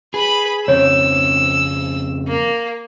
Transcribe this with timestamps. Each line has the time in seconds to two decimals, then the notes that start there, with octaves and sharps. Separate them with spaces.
0.14 G#4 B4 B5
0.68 F2 C#3 C4 C#5 E6
2.28 A#3